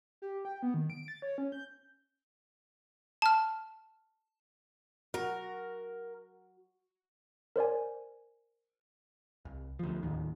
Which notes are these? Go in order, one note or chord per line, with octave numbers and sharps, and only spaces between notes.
G4
G5
B3
D#3
D7
A6
C#5
C#4
G6
A5 F6
F#4 A#4
A#4 C5 D5 G#5
C2
D2 F3
D1 D#2 D#3